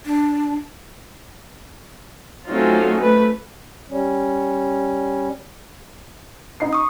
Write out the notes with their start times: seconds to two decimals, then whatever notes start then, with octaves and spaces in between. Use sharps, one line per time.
0.05 D4
2.50 F#3 A3 C4 C#4 D#4 F4
3.01 A3 B4
3.90 G3 C#4
6.60 D#4 C7
6.73 C#6 D#6